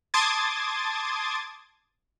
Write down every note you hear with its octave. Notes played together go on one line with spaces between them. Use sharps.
A5 C6 D6 D#6 G#6 A6